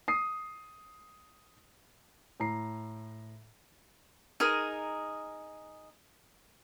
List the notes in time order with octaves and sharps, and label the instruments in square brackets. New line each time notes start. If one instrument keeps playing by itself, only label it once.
[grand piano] D#6 C7
A2 A#5 C7
[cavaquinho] D#4 G#4 A#4